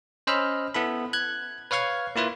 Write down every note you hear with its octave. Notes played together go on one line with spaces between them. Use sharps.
C#4 C5 D#5 B5 E6 F6
B3 E4 A4 B5
F#6 G#6
B4 C#5 F5 C#6 F6 G#6
A#3 E4 F4 B4